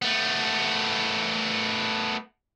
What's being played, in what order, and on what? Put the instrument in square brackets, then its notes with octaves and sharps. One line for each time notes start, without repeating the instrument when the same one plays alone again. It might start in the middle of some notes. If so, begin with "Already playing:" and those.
[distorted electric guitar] A3 B3